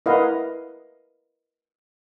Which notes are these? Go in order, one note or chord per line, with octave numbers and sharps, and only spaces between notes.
E4 A#4 B4 D#5 F5 F#5